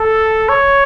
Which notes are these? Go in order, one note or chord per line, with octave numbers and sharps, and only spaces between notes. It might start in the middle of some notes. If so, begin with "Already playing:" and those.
Already playing: A4
C#5